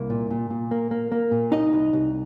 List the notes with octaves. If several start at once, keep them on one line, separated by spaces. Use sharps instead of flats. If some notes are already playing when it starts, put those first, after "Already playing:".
Already playing: C2 A#3
A#2
A#2
A#2
A#3
A#3
A#3
A#2
C2 D#4 D#5
C2
C2